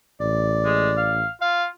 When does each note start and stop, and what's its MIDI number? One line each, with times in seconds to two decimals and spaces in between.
0.20 1.24 33
0.20 1.20 74
0.65 0.91 56
0.97 1.29 77
1.41 1.68 65
1.41 1.67 77